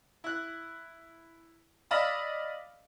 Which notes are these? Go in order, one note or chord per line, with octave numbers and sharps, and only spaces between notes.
E4 F#6
D5 D#5 F5 B5 D#6 E6